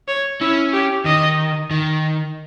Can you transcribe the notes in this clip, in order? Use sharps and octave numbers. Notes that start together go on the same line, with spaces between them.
C#5
C#4 E4
G4
D#3 D#5
D#3